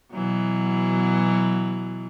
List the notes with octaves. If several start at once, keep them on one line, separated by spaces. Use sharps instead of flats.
B2 E3 F#3